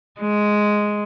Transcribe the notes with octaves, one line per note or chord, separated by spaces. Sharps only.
G#3